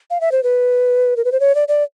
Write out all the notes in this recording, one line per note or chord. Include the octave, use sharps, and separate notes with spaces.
F5
E5
C5
B4
A#4
B4
C5
C#5
D5
D5